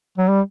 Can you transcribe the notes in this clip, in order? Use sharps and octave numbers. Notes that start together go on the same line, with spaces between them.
F#3
G3